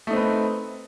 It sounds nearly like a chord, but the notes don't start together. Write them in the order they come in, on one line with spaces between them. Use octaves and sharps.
A3 D#4 C4 B4